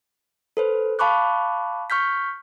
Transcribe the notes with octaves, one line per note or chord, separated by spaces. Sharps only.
A4 B4 C5
F5 A5 B5 C#6 D6 F#6
C#6 F6 G6 B6